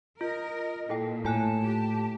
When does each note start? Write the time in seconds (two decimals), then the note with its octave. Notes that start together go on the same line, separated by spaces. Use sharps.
0.21 F4 A#4 D#5
0.89 A#2 E4 A4 G5
1.25 A2 F4 G#5 A5 F#6
1.63 G4